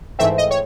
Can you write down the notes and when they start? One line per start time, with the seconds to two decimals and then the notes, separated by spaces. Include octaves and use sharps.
0.19 G#2 E3 A3 C4 E5
0.38 D#5
0.51 C#5